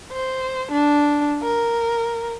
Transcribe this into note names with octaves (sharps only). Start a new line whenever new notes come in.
C5
D4
A#4